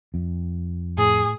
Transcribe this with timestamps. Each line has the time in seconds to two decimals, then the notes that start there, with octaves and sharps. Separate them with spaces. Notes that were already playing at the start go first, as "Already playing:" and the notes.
0.14 F2
0.98 A2 G#4